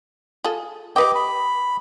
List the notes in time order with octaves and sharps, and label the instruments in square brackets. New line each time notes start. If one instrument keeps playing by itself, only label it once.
[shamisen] F4 G#4 A4
[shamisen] G4 B4 G5 [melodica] D#5 D6
[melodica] B5